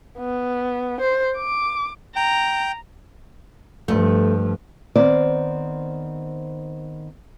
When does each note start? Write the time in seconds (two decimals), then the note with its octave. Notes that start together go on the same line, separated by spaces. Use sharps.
0.19 B3
1.00 C5
1.37 D6
2.16 G5 A#5
3.88 G2 F3 A3
4.96 D#3 B3 C4 C5 D5